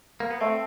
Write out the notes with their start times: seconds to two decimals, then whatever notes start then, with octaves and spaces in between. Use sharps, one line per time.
0.20 A#3
0.30 B3
0.41 A3 C4